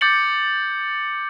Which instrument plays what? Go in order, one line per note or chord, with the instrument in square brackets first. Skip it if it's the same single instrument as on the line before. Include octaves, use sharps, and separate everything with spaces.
[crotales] D6 G6 A6 C#7 F#7